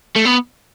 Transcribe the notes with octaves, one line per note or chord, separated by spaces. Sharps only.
A3
B3